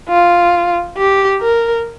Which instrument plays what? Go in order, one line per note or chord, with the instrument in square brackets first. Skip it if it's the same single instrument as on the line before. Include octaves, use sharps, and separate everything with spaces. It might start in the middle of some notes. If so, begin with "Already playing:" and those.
[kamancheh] F4
G4
A#4